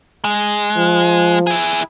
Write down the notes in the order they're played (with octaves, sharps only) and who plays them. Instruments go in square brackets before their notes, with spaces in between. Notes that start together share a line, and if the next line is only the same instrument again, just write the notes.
[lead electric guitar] G#3
[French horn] F3
[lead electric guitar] E4 G#4